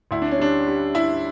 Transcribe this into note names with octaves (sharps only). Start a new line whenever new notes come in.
D2 E4
D4
C#4
G3 D4
G3
G3 E4